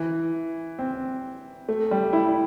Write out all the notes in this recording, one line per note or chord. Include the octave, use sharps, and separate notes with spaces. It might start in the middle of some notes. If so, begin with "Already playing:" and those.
Already playing: E3
C4
A3
G3
E4